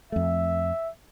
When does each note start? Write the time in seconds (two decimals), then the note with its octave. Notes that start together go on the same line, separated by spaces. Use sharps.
0.12 F2 A3 E5